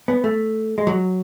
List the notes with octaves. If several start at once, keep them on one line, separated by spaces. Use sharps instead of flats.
B3
A3
G#3
F#3